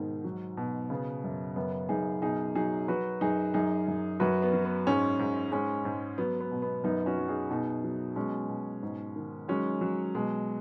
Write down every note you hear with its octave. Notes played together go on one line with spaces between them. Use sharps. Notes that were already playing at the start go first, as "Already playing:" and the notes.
Already playing: G#2 B2 D#3
F#3
B2
C#3 B3
F#2
F#2 B3
F#2 D#4 G#4
B2 D#4 G#4
F#3 D#4 G#4
F#3 F#4 B4
F#2 D#4 G#4
F#2 D#4 G#4
F#2
F#2 F#4 B4
B3
F#3
B3
G#2 G#3 C#4
G#2
G#2 G#3 C#4
G#2
F#3 B3
B3
B2
B3
F#2 B3 D#4
C#4 F#4
F#3
D#4 G#4
B2 D#4 G#4
F#3
B2 G#3 C#4
B2
G#2
D#3
F#3 G#3 C#4
F#3
B2 G#3